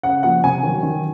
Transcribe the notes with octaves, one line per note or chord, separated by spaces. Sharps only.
C#3 F#5
F3 A#3 F#5
C3 G#5
D#3 F#3
D#3